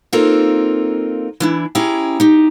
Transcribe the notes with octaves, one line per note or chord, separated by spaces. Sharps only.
A#3 C4 D#4 F4 A4 A#4
E3 D4 E4
C#4 E4 G4 G#4 A#5
D#4 G4